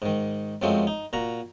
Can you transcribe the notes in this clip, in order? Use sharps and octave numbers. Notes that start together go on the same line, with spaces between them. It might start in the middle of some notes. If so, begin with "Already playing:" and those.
G#2 D#3
F#2 F3 F#3 G#3 A3 C4
D#4
A#2 F#4 A#5